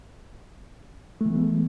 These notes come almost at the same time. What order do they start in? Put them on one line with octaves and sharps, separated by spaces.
A3 E3 B3 G#3